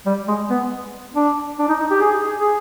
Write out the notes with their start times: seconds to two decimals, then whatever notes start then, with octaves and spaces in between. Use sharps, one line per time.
0.06 G3
0.28 G#3
0.51 B3
1.15 D4
1.59 D4
1.69 D#4
1.80 D#4
1.91 G4
2.01 G#4
2.20 G#4
2.39 G#4